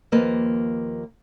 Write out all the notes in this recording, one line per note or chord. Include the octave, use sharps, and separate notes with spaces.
D#2 F3 A#3 B4 D#5